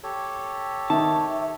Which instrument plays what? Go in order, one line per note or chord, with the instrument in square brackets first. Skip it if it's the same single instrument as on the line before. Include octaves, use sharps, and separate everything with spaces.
[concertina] G4 A4 C#5
[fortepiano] D#3 [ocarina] E5 [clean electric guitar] A5